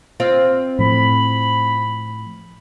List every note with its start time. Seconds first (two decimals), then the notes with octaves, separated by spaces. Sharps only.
0.20 C4 F4 F5
0.79 A2 F3 B5